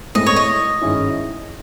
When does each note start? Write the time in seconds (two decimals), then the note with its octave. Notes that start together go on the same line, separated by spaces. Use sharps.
0.15 A2 G#3 C4 E4 D#5
0.26 C#5
0.36 D#5
0.81 G#2 D#3 G#3 C#4 E4